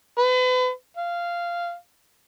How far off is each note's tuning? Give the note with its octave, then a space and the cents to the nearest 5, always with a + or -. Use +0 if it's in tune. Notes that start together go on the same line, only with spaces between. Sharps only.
B4 +40
F5 -10